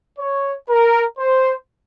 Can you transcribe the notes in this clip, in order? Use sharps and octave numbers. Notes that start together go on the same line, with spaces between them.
C#5
A#4
C5